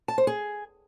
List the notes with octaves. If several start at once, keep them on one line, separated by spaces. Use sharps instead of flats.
A5
C5
G#4